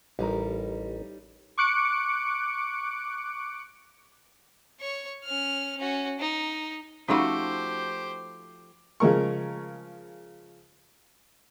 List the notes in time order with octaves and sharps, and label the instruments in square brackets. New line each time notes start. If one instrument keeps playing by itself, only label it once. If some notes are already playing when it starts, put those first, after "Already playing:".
[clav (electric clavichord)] A1 A#5 [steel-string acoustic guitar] G3 D#4 A#4
[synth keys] C#6 D6 F#6 C#7 D7
[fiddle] C#5 C#6
C#4 F6
C#4 F#4
D#4
[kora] F3 A3 F#4 [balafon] C#4 D#4 B5 [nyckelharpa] G4 C5
[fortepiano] C#3 F3 G#3 A#4 C#6